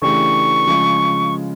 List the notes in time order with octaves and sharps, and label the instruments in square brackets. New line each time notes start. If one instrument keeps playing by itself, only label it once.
[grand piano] C#3 E3 A3 D4 G4 [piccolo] C#6
[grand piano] C#3 F3 G#3